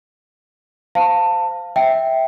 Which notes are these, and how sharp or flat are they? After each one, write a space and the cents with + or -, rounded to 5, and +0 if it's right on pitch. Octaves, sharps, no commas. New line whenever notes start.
C5 -20 F5 +0 A5 +20
E5 -10 G5 +0